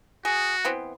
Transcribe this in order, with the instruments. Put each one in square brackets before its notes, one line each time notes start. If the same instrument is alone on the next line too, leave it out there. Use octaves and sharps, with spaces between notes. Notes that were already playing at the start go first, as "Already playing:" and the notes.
[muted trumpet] F#4 [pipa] G#4
[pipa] E3 B3 C4